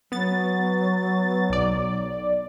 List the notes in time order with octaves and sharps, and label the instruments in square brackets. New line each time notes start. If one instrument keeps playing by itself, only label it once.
[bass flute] F#3 [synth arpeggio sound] B3 A6
[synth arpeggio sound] B1 D5